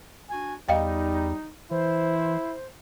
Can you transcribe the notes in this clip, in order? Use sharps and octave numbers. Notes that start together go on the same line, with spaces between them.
D4 F#4 G#5
E2 G3 D#4 D#5 F5 G5
E3 E4 C5